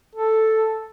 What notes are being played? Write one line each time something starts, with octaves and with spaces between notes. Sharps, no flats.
A4